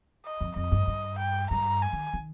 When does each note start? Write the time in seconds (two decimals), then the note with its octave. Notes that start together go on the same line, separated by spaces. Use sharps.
0.25 D#5
0.41 F2
0.56 F2 D#5
0.72 G2
0.87 G2
1.19 G5
1.51 G2 A#5
1.82 G#5
1.93 D#3
2.14 D#3